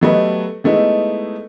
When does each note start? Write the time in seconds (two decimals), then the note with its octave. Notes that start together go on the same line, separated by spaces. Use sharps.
0.01 F#3 G3 A3 B3 B4 D#5
0.64 G#3 A3 B3 D#4 E4